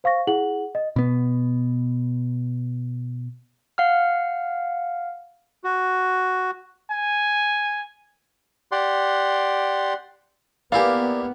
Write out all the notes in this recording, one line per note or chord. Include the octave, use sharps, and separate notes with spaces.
C5 F5 C#6 A#6
E4 G#4 F#5 F#7
D#5
B2 B3
F5 F#5 F6
F#4
G#5
G4 D5 F#5 C6
A#3 B3 E4 G4 A#4 D5 F5 G#5